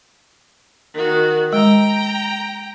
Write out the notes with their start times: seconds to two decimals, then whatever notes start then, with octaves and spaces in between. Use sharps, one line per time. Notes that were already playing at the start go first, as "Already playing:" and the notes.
0.94 D#3 F#4
1.53 G#3 G5 A#5